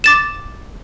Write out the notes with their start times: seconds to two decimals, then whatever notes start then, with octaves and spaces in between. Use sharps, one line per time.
0.04 D6 A6 E7